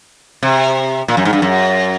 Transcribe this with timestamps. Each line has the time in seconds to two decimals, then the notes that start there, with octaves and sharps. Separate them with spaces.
0.43 C3
1.08 A#2
1.17 F#2
1.25 G#2
1.33 G2
1.42 F#2